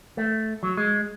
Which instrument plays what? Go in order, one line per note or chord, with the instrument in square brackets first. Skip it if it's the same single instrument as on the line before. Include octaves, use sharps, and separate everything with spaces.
[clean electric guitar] A3
F#3
G#3